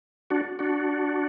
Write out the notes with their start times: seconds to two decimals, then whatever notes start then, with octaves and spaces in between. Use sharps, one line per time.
0.30 D4 F#4
0.59 D4 F#4